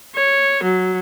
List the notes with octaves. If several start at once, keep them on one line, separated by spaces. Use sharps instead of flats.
C#5
F#3